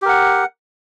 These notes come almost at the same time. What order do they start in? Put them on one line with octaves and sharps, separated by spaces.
G4 A#4 F#5